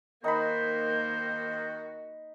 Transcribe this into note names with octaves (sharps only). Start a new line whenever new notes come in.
D#3 A#3 D#4 F#4 C5 B5 G6